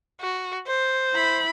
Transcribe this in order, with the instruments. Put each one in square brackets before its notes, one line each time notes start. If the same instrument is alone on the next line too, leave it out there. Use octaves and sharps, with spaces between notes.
[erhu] F#4
C5
[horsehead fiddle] E4 B5